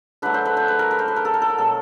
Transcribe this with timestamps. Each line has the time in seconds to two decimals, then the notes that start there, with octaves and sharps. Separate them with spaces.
0.22 D3 F#3 A3 B4
0.34 C5
0.45 B4
0.57 C5
0.68 B4
0.79 A#4
0.91 B4
0.99 C5
1.08 B4
1.16 A#4
1.25 A4
1.34 A#4
1.42 A4
1.50 A#4
1.58 B2 F#3 A3 A4